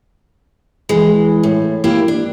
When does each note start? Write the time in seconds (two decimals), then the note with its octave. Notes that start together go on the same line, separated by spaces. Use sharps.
0.89 E3 G#3
1.43 A2
1.84 A#3 E4 G4
2.08 D4